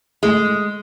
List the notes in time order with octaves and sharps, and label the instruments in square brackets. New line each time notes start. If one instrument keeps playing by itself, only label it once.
[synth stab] A2 A3 [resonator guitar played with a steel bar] G#3